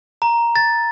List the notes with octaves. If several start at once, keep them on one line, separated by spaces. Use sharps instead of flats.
A#5
A6